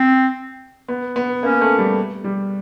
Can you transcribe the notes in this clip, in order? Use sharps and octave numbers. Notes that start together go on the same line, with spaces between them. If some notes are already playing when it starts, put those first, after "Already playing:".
Already playing: C4
B3
B3
A#3 C#4
A3
G3
G3